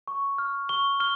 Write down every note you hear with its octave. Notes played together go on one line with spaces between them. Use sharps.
C#6
F6
C#6 G7
F6 G7